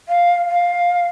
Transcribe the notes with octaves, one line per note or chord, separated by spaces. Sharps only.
F5
F5